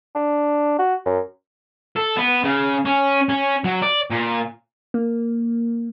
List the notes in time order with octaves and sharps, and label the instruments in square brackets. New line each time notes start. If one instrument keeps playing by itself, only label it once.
[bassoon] D4
F#4
F#2
[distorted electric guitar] A4
B3
C#3
C#4
C#4
F#3
D5
A#2
[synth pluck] A#3